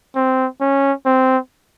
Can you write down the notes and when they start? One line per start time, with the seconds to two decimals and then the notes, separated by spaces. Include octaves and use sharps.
0.15 C4
0.61 C#4
1.06 C4